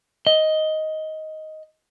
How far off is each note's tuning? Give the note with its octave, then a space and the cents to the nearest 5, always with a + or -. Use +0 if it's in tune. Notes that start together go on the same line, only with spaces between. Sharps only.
D#5 +10